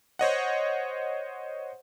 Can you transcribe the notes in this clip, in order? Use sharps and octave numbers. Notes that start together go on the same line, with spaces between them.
C5 C#5 D#5 F#5